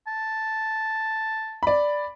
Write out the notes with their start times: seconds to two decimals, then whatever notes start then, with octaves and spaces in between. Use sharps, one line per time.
0.07 A5
1.63 D5 B5